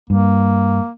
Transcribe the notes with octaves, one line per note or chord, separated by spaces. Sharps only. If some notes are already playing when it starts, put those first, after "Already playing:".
G2 A#3